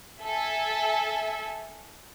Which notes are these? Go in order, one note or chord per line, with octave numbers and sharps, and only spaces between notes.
A4 E5 G#5